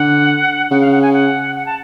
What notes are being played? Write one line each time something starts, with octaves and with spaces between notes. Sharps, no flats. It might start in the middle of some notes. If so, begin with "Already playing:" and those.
Already playing: D3 F#5
C#3 F#5
F5
F#5
G#5
F#5
F#5
A5